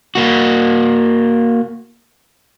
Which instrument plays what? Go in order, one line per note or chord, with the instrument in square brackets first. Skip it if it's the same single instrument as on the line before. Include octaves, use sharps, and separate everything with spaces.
[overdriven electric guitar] A#3 F#4